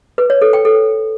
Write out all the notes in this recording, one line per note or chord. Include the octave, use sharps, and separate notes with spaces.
B4
C#5
A4
G5
A4